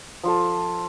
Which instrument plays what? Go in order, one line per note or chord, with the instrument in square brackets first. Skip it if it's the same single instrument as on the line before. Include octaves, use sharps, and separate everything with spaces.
[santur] F3 F4 A4